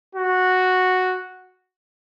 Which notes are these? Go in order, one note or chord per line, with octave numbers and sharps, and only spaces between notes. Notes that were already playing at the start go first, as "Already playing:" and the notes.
F#4